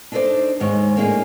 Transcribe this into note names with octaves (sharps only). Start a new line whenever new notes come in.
D4 D#4 A4 B4 C5 D5
D#2 G#2 D#3 G#3 C#5
A2 A#3 D4 E4 G#4 D#5